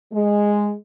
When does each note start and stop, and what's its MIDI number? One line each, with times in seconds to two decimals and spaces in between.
0.13 0.74 56